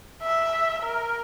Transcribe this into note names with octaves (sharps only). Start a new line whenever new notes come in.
E5
A#4